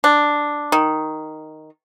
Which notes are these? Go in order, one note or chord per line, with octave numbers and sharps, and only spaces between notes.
D4
D#3